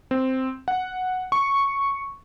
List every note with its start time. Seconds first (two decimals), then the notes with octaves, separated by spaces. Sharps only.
0.11 C4
0.68 F#5
1.32 C#6